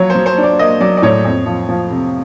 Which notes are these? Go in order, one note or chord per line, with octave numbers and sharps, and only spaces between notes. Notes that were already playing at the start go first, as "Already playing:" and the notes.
Already playing: F3 F#3 C#5
C5
F#3
C5
D4
D5
A#3 D#5
F#3 D5
D5
A2 C#5
F2
F3
F3
C3